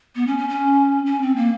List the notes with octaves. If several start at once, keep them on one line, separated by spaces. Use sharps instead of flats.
B3
C#4
C#4
C#4
C#4
C4
A#3